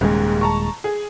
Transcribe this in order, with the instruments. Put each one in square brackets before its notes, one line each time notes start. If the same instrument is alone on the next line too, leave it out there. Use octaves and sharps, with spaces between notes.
[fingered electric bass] D#1 G#3 [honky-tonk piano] D#2 G#2 C#3
[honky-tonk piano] A5 A#5 C#6
G#4